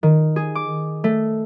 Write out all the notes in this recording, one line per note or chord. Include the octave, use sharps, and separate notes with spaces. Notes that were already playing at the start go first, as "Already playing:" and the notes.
D#3
G#4
D6
A3